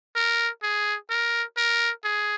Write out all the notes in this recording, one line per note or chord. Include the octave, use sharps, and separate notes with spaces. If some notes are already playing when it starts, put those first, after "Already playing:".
A#4
G#4
A#4
A#4
G#4